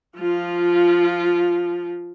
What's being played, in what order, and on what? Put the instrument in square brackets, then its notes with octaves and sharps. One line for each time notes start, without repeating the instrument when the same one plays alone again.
[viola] F3 F4